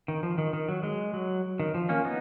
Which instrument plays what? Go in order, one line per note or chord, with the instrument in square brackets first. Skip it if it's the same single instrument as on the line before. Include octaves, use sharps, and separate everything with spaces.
[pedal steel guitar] D#3
F3
D#3
D#3
F#3
G#3
F#3
D#3
F3
A#3 C#4
B3 D#4